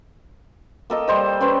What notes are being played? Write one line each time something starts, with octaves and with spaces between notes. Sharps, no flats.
A#3 A4 D#5
G3 C5 D#5
C#4 B4 C5